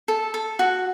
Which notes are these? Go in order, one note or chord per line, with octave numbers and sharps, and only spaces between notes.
A4
A4
F#4